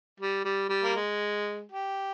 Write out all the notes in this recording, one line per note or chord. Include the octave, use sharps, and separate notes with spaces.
G3
G3
G3
A#3
G#3
G4